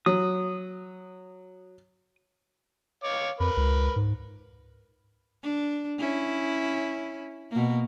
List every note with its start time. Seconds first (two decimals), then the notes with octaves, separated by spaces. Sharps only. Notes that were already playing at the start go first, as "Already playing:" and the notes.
0.06 F#3 D#6
3.04 C#5 F5 D6
3.40 F2 A#4 B4 B5
3.57 C#2
3.96 G#2
5.43 D4
5.98 C#4 E4
7.51 B2 A#3